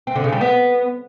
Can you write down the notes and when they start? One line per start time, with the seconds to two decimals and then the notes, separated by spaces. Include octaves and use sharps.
0.07 C4
0.16 D3
0.24 C#3
0.32 G3
0.41 B3